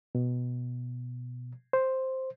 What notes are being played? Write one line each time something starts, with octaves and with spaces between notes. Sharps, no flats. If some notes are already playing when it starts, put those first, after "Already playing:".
B2
C5